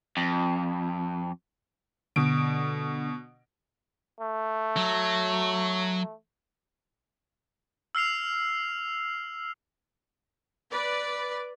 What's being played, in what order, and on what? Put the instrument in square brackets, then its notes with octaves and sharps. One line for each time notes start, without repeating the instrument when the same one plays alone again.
[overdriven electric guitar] F2
[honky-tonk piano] B2 D7 [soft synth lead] D3
[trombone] A3
[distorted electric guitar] F#3
[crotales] E6 F6 C7 F7
[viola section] B4 D5